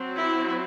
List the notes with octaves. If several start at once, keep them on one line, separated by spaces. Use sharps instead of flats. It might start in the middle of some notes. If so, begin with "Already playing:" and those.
Already playing: F#3 C4
E4